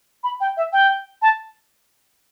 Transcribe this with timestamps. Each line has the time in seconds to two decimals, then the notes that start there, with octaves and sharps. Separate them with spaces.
0.24 B5
0.40 G5
0.57 E5
0.73 G5
1.22 A5